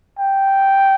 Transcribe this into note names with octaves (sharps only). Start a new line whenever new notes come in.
G5